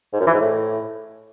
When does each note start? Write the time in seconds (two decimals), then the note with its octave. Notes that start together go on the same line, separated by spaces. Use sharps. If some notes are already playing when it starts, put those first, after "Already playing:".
0.13 G#2
0.20 F#2
0.27 E3
0.34 G#2
0.40 A2